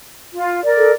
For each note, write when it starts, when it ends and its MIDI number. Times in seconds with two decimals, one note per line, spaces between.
0.33 0.64 65
0.64 0.91 70
0.64 0.91 74
0.78 0.91 69